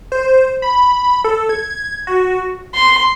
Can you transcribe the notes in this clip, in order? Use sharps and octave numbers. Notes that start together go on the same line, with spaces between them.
C5
B5
A4
G#6
F#4
C6